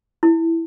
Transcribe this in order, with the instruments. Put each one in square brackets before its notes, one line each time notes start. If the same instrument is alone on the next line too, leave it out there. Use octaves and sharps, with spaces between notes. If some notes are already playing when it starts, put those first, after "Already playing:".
[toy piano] E4